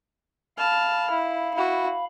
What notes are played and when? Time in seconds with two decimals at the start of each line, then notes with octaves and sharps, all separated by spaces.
0.58 F5 A5 B5 F6
1.10 E4
1.54 E4 F#4